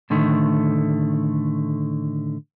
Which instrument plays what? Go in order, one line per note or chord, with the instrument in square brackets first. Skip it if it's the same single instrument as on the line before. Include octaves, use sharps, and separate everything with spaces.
[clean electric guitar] A2 D3 D#3 A3